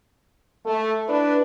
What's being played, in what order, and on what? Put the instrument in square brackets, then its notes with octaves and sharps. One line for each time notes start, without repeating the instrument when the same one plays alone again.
[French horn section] A3
D4 E4 B4